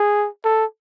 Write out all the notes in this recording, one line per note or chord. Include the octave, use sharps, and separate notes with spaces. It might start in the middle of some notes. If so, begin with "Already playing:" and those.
Already playing: G#4
A4